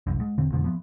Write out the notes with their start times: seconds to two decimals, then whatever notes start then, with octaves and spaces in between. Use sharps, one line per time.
0.07 G1 C2 F#2
0.20 G#2
0.38 E1 D3 C4
0.52 F2 G#2 B2 D3
0.64 F3 B3